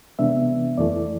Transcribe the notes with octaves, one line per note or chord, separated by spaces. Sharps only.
C3 E3 G#3 B3 D4 E5
F2 E3 A3 E4 D5